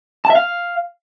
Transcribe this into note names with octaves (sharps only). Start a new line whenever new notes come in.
A5
E5
F5